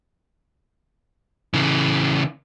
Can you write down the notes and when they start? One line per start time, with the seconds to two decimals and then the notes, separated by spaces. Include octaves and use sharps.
1.54 C#3 E3